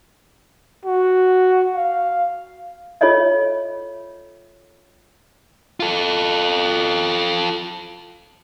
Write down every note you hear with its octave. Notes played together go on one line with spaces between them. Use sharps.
F#4
F5
F4 A4 C#5 D#5 E5
F4 A4